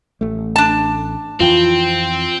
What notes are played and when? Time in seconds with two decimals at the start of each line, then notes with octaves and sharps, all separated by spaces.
0.21 A1 A3
0.56 D4 A5
1.40 F2 E3 C4 F4 G5